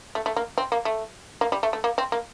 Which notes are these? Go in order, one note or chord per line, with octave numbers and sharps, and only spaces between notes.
A3
A3
A#3
C4
A#3
A3
A#3
G3
A3
A3
A#3
C4
A#3